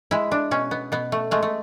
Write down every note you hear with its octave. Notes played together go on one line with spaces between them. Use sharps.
G#3 E4
D4
B2 C#4
B3
B2 B3
A3
G#3 A3
A3